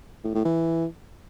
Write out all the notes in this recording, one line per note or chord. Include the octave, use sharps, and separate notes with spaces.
A2
A2
E3